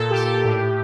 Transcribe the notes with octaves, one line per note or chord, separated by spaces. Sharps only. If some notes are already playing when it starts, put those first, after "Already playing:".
Already playing: A#2 A4
G4
A2